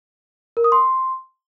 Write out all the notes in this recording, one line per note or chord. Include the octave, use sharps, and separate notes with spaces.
A#4
D#6
C6